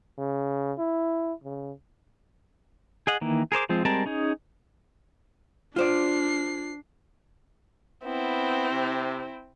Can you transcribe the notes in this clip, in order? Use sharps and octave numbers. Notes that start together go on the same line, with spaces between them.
C#3
E4
C#3
G#4 D#5 F#5
D#3 E3 A#3
G#4 A#4 C5 D6
F3 G#3 C4 F4
G3 G#3 C4 A#4 A5
C#4 D#4 G#4
D4 F4 C5 D5 C7
B3 C4 E4
C3